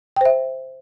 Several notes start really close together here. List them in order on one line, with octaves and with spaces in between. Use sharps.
G5 C5 E5